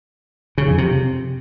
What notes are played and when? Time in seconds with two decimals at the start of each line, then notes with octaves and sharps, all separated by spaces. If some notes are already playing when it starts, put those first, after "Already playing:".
0.58 C#3
0.68 F2
0.78 C3